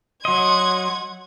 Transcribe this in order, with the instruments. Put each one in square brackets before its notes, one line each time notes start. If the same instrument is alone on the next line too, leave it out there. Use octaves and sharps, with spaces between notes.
[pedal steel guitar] F#3 D#5 [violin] F#5 G#6 [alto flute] C6